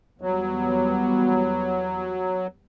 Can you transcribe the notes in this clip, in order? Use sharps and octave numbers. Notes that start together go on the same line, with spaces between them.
E2 F#3 G3 B3